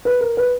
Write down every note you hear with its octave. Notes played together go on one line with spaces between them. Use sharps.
B4
A#4
B4